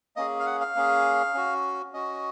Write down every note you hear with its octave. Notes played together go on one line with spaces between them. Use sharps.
A#3 C#4 G#4 D#5
F5
F#5
F5
A#3 C#4 G#4
C#4 F#4
C#4 F#4 D#5